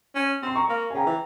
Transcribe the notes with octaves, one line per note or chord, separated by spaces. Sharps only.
C#4
C4 C6
A#5 C#6
A#3
G#5
C#3 G5 A#5
E3